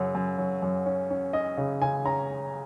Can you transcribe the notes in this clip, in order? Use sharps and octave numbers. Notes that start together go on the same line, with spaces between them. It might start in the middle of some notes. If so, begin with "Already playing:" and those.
Already playing: F#2 C#3 F#3
F#2
F#3
F#2
C#4
C#4
C#4 D#5
C#3
C#3 G#5
C#4 A#5